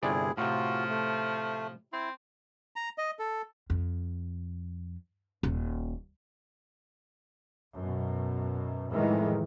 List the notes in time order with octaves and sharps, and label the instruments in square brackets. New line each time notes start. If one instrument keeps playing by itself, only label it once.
[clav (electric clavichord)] G1 C3 D5 [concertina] E4 G#4
[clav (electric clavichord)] A2 C3 [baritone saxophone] F3 [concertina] F4 F#4
[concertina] A3
[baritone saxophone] C4 [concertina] E4
[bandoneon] A#5
D#5
A4
[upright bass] F2
D#1
[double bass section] F#2 B2
F2 A2 D#3 E3 G#3